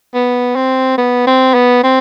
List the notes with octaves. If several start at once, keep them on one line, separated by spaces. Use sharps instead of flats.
B3
C4
B3
C4
B3
C4